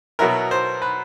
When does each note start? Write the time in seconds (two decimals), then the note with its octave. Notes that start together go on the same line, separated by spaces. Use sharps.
0.19 B2 F#3 B3 E4 A#4
0.51 C5
0.82 B4